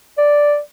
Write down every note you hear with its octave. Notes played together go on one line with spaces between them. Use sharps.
D5